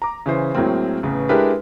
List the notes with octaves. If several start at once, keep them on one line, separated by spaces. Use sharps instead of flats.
A#5 D6
C#3 E3 C5
A2 F#3 G#3 A#3 C4
A1 C#3 B3
G#3 D4 E4 G4 A#4 B4